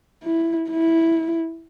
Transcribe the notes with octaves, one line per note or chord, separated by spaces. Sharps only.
E4
E4